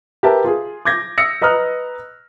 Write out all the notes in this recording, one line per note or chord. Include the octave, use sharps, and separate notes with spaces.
G4 A#4 B4 E5 A5
F4 G#4
D6 G6 G#6 A#6
D#6 E6 A#6 C#7
B4 D#5 A#5 D#6 F6 F#6